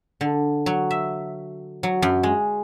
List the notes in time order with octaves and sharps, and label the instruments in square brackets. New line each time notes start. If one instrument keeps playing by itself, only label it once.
[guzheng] D3
F#3
E5
F#3
F#2
G#3